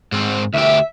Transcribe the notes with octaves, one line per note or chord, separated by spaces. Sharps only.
G#2 C4
D2 G4 E5